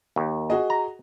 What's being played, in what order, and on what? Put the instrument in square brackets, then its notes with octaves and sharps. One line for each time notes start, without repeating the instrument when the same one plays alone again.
[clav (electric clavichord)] D#2
[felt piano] F#4 G#4 D#5
[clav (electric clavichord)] A#5